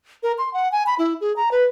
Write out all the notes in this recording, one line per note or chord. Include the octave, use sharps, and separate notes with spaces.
A#4
C6
F#5
G#5
B5
E4
G#4
A#5
B4